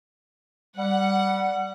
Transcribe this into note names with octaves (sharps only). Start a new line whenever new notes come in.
G3 F#5